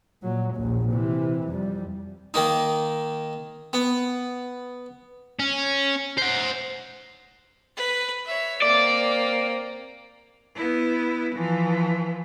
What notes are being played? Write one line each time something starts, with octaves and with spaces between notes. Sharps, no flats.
A#2 F#3
A#1 D#2
C3 E3
F2 G3
D#3 A#3 D#4
B3
C#4
C5 F#5
B4
C#5 E5
A#3 C4 D5
B3 E4
E3 F3